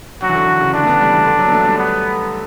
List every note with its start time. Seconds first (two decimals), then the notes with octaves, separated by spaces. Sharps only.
0.22 F#3 F#4
0.29 E3
0.35 D3
0.48 D3
0.61 C#3
0.74 D3 D4
0.83 A3
0.87 B3
1.01 G3
1.13 E3
1.26 D3
1.39 F#3
1.47 B3
1.52 A3
1.65 G3
1.78 B3